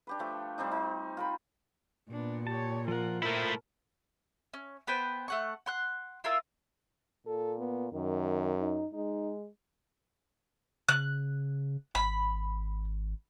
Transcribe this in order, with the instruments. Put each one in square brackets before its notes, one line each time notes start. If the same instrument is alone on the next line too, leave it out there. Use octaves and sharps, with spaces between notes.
[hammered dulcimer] D4 G4 B4
F3 A3
G3 C4 D4 D#4
D#4
F4 A#4 B5
[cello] A#2 [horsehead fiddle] B3 D4
[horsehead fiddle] G4 C#5 [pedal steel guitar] A5
[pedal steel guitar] F3 F#5 [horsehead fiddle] F4 A#4
[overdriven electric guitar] A3 E4 [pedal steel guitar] F4 C5 E5 [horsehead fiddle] A#4
[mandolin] C#4
B3 B4 C5 G5
A3 F#5 C#6
F#5 C6 F#6
E4 F4 A#4 E6
[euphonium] A#2 [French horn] A4
[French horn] B3
[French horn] F#2 [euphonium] D#3
[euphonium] D#4
[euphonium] G#3 [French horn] D#4
[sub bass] C#3 [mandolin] F#6
[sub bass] G#1 [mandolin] B5